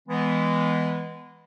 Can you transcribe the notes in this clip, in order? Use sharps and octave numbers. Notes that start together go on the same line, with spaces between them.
E3 G#3 B3